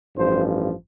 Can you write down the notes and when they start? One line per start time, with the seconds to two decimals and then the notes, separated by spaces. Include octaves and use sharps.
0.16 A1 G2 F3 C5